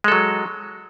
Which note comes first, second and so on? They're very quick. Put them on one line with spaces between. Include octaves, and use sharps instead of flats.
G#3 A4 F#3